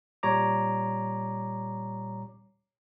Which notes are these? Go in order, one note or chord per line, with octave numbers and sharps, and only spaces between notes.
A#2 G3 C#5 A#5 D6